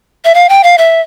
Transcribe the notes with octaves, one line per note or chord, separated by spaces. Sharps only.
E5
F5
G5
F5
E5